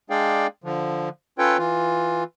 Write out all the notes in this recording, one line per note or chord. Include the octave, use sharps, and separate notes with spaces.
G#3 D4 G#4 D5 F5 G5
D3 F3
C#4 F4 A4 B4 C#5 G5
E3 F4